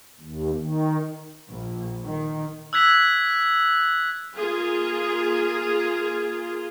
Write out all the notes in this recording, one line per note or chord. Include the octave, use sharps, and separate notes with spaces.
D#2
D#3
A#1
D#3
E6 F#6 G#6 B6 F7
A#3 F4 G#4